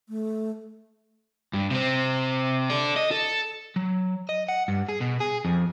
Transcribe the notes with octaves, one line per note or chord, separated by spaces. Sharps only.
A3
G2
C3 C4
A4 D5
D#5
A4
F#3
D#5
F#5
G2
G#4
B2
G#4
F2